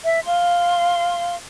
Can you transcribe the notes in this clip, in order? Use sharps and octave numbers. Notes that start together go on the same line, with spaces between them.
E5
F5 C6